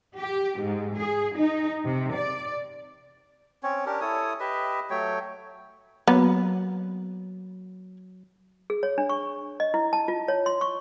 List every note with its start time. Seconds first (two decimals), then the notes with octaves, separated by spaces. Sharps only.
0.17 G4
0.61 G#2
0.97 G#4
1.36 D#4
1.84 C3
2.15 D5
3.63 C4 C#4 C#5
3.86 C#4 D4 G4 A#4
4.01 E4 A4 C#5 D#6
4.40 G4 B4 D#5 E5
4.90 F#3 A3 C#5 G5
6.07 F#3 A#3 B3
8.70 G#4
8.83 C#5
8.98 D4
9.09 C#6
9.60 D#5
9.74 E4
9.93 A5
10.08 F4
10.28 C#5
10.46 C6
10.61 C#6